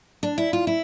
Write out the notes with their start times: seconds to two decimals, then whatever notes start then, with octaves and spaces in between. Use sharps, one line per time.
0.23 D4
0.38 E4
0.53 F4
0.67 E4